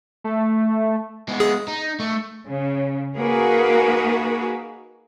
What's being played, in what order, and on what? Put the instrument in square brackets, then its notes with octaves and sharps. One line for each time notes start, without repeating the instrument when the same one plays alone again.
[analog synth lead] A3
[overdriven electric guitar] G#3 B3
[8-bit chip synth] G#4
[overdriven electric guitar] D#4
A3
[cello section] C#3
A#3 D#4 F#4 G#4 A#4 B4